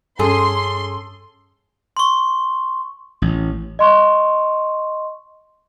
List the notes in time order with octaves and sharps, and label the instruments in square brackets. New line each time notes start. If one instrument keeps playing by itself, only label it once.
[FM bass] G2 [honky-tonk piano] C#4 A4 [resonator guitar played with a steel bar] G#4 [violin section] C6
[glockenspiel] C6 C#6
[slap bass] A1
[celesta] D#5 C6 C#6